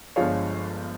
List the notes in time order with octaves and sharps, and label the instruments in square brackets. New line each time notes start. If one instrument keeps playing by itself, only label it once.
[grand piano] G1 G2 F3 G#3 C#5 F5